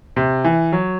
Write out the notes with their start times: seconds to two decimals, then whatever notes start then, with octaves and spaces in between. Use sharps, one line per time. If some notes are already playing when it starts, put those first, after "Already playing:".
0.16 C3
0.44 E3
0.73 F#3